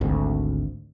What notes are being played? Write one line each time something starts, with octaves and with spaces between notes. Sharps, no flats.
G#1 D2